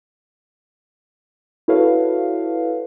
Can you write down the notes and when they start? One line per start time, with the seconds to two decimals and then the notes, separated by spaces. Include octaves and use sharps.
1.68 E4 F#4 A4 B4 C#5 F5